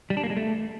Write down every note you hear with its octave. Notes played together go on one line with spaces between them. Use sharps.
G3
D4
A#3
G#3
A3